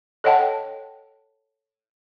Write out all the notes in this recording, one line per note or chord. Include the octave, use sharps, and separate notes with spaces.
A4 C#5 D#5 F#5 G5 A5